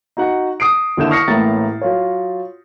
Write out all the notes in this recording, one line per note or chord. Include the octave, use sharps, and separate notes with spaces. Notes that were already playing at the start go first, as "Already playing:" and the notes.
D#4 F#4 F#5
D#6 C7 D7
D#2 D3 E4 G6 E7
C#6 D#6 F6 A#6 C7 C#7
A1 A2 G#3 A#3 A#5 A6
F#3 F4 C#5